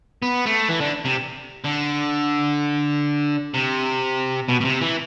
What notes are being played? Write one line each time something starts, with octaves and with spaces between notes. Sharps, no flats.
B3
A3
E3
D3
C3
D3
C3
B2
B2
C3
E3